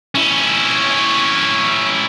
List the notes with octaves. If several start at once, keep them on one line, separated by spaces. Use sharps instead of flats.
C#4 E4